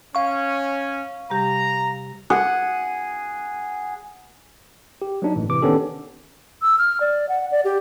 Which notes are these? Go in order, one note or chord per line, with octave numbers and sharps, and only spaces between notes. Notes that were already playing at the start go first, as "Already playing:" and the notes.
C#4 F5 C#6
C3 G3 G4 A#5
G#4 F#5
G4
F#3 A#3 D4 D#4
G1 A2 E3
C3 E3 D6
D#3 B3 C#4 D4 G4 A4
E6
F6
D5
F#5
D5
G4